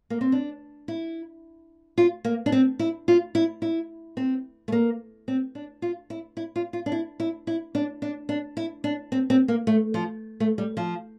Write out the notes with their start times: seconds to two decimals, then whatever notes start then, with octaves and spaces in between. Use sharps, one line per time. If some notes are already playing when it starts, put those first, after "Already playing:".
0.10 A#3
0.21 C4
0.32 D4
0.88 E4
1.98 F4
2.25 A#3
2.46 D4
2.52 C4
2.79 E4
3.08 F4
3.35 E4
3.62 E4
4.17 C4
4.68 A3
4.72 A#3
5.28 C4
5.55 D4
5.82 F4
6.10 E4
6.37 E4
6.56 F4
6.73 F4
6.86 D4
6.92 E4
7.20 E4
7.47 E4
7.75 D4
8.02 D4
8.29 D4
8.57 E4
8.84 D4
9.12 C4
9.30 C4
9.48 A#3
9.67 A3
9.94 F3
10.40 A3
10.58 G3
10.77 F3